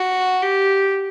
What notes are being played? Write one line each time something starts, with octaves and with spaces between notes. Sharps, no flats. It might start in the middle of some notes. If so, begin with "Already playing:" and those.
Already playing: F#4
G4